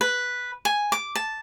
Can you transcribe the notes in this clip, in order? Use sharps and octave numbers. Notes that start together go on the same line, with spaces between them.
B4
G#5
D6
A5